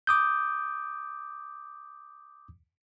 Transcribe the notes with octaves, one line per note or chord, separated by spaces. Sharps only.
D6 D#6 G6